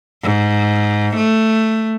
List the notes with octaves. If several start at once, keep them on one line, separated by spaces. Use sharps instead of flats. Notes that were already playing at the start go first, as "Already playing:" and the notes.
G#2
A3